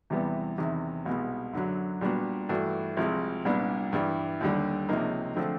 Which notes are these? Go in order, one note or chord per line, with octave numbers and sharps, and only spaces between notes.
E2 C3 E3 G3 B3
E2 C3 D#3
C2 B2 G#3 B3
F#2 D3 F#3
A#2 G3 B3 D4 F#4
G2 E3 A3 D4 F#4
C2 C3 F3 G#3
C2 A#2 G3 B3 D4
G2 E3 G3
D#2 D3 G3
C#2 C3 F3 A#3 D#4
D3 F3 A3 C4